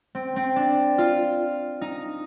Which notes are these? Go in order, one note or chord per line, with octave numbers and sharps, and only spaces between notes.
C4
C4
D4
F4
D#4